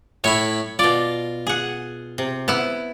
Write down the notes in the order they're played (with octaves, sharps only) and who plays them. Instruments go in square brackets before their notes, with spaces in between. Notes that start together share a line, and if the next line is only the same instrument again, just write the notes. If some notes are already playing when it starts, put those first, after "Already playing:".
[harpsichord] A2 E4 B5 [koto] C#5
[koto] B2 D5 [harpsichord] F4
[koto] G#4 F#5
C3
B3 E4